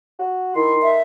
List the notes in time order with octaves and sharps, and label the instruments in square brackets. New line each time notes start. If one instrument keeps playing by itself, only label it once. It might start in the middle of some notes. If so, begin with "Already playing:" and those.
[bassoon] F#4
[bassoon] D#3 [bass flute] E4 [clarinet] C6
[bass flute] E5